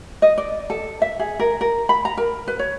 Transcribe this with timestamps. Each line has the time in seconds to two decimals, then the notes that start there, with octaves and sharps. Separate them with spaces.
0.22 D#5
0.38 D5
0.70 A4
1.02 E5
1.19 G#4
1.40 A#4
1.61 A#4
1.89 B5
2.05 A#5
2.17 A#4
2.48 B4
2.59 C#5